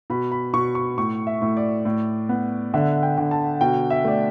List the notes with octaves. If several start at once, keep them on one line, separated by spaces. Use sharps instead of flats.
B2 B5
B5
B2 C#6
C#6
A2 C#6
E5
A2
D5
A2
B3
D3 E5
G5
D3
A5
B2 G5
E5
A3 D5